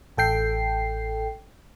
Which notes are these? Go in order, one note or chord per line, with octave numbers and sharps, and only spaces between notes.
A1 A4 G5 C7